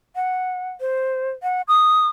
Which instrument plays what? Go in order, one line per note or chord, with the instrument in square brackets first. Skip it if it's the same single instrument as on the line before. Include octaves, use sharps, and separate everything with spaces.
[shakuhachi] F#5
C5
F#5
D#6